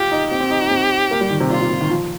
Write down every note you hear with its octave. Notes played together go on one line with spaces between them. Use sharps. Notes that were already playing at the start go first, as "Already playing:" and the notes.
Already playing: F4 G4
D#4
C4 G4
C4
D#4
D#4
C4
A#3
G3
D#3
C3
A#2 F4
A#2
C3
D#3
F3